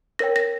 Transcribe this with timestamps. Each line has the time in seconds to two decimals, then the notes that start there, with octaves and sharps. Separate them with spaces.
0.19 A#4 C#5 G5 A#6
0.36 A#6